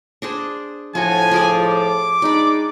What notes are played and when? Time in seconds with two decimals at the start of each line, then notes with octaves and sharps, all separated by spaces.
0.22 D4 G#4 C5
0.95 A2 F3 F4 F#4 G#5
1.31 F4 G#4 D5
1.67 D6
2.22 G#3 D4 D#4 D5 B5